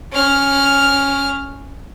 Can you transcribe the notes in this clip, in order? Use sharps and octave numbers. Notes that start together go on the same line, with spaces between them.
C#4 F6